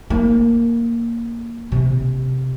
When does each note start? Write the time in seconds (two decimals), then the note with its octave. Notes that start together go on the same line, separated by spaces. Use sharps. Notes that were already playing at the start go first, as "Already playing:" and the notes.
0.10 A#3
1.72 C3